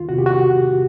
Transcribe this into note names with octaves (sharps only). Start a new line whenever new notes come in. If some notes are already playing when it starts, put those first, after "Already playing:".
Already playing: E2 D#3 F4
C3 F#4
G4
F#4